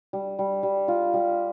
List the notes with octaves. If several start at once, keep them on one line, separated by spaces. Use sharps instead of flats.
G3
G3
G3
F4
G3